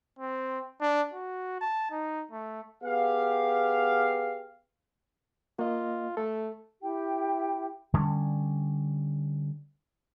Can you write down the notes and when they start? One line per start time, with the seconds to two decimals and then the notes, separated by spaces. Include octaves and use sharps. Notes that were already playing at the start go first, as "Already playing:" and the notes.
0.19 C4
0.81 D4
1.14 F#4
1.61 A5
1.91 D#4
2.32 A3
2.83 B3 G4 G#4 F5
5.59 A#3 F4 D#5
6.17 A3 A4
6.82 E4 G4 G5
7.94 D3 G3 A#3 C#4